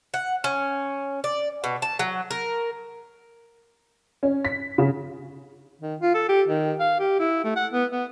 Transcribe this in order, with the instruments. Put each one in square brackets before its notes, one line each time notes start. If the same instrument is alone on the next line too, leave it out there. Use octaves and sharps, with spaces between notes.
[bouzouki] F#5
C#4
D5
B2
A5
F#3
A#4
[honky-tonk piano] C#4
B6
C#3
[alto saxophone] D#3
F4
A4
G4
D#3
F5
G4
E4
A3
F#5
B3
B3